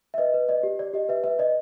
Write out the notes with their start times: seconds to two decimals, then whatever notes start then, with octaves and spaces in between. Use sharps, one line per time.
0.14 E5
0.18 B4 D#5
0.34 B4
0.49 D5 D#5
0.63 G4
0.79 D5
0.94 G4 D#5
1.09 B4 E5
1.24 B4 E5
1.39 D5 D#5